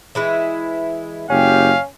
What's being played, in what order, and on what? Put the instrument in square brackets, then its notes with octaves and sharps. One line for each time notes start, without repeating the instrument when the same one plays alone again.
[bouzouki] E3 G#3 E4
[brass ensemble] F#1 F#3 G4 [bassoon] C#4 [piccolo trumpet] F5